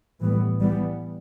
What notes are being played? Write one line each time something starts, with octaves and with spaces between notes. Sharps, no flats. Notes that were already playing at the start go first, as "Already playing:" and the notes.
A2 E3 G3 B3
E3 G3 B3